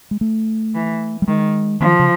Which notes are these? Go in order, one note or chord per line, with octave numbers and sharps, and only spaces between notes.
G#3
A3
E3
G3
D#3 G#3
D#3 F3
C#3